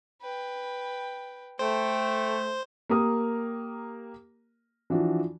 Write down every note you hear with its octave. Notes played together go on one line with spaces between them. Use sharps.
B4 G5
A3 C5 G5
A#3 G4 A#4 A#5 D#6
E3 F3 D4 F#4